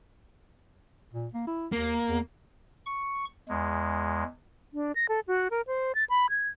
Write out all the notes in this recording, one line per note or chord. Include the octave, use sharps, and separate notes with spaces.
A#2
A#3
E4
D#2 A#3
E2
C#6
E2 G#3
D4
A#6
A4
F#4
A#4
C5
A6
B5
G#6